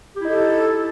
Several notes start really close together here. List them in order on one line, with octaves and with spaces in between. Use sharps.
G4 E4 D#4 A4